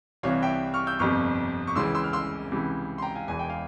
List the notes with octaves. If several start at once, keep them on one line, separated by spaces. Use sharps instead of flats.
C2 C3 E3 C#5 F5
E5 G5
C#6 F6
E6 G6
G1 F2 C3 C#6 F6
C#6
C#2 C#3 E3 C6 E6
C6 E6
F6
C6 E6
C#2 C3 E3
C6
G5 A#5
F5 G#5
E1 E2 E3 G#5
G5
F5